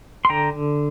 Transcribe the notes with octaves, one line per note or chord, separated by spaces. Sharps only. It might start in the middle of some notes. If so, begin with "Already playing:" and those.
C6
D3 G5 A#5